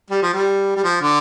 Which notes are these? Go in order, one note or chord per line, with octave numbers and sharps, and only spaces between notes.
G3
F3
G3
G3
F3
D3